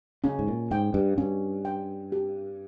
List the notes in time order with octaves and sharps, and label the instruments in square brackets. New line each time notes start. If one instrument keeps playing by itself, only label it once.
[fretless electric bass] C#3 [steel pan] C#4
[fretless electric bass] G#2
A#2
[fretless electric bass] G#2 [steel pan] G5
[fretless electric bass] G2
[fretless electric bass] G2 [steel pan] C#4
[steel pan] G5
G4